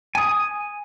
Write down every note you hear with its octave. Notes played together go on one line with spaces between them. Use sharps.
G#5 D#6